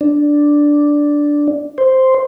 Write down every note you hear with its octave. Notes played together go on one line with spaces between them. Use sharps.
D4
C5